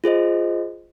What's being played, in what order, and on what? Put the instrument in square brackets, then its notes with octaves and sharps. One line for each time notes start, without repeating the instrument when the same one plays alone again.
[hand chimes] F4 G#4 C5 D#5